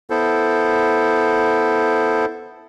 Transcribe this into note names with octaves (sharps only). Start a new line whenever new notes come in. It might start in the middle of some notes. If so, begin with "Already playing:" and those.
B3 E4 A4 C5